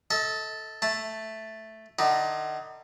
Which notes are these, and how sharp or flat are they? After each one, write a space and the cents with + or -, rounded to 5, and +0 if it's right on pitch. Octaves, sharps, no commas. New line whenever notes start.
A4 +0 D#5 +40
A3 +0 A5 +0
D3 +40 D#4 +25